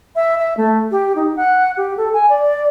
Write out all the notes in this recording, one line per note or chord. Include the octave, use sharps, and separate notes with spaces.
E5
E5
A3
G4
D#4
F#5
G4
A4
G#5
D5